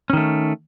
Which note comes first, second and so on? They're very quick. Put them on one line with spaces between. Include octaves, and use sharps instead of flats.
C#4 D#3 A3